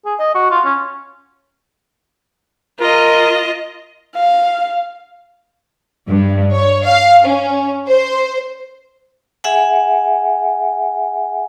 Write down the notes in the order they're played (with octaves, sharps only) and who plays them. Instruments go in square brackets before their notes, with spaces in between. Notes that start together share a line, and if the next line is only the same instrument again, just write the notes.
[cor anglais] G#4
D#5
F#4
F4
C#4
[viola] F4 D#5 [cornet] A#4
[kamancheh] F5
[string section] G2
C#5
F5
C#4
C5
[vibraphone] G#4 E5 F#5 G#5